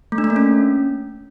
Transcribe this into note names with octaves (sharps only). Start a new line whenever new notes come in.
A3
D4
A3
A#3
C#4